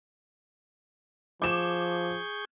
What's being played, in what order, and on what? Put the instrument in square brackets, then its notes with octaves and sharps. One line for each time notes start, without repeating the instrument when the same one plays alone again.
[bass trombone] F3 [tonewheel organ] G#4 C#6 G6 [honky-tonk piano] D6 E7